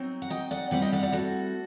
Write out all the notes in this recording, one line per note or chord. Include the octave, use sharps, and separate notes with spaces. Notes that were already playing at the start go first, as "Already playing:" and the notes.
Already playing: F#3 C4 D#4
F#5
D#5 G5
D5 F#5
A2 G3 C4 D5 F#5
D#5 G5
D5 F#5
D5 F#5
F#4 A4